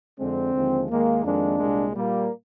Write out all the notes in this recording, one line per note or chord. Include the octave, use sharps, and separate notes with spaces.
F2 D3 G#3 C4
D#2 D3 F3 G#3
D#2 D#3 G#3 A#3
F2 D#3 G#3 A#3 D4
C2 A#2 G#3
A#2 G3 A#3